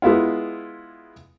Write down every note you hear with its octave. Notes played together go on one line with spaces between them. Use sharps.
G#3 B3 E4 F4